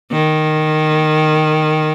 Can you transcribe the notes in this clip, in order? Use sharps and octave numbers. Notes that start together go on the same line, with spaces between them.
D#3